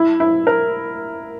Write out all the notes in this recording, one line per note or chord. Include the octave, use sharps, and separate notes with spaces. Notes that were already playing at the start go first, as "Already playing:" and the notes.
Already playing: E4
E4
A#4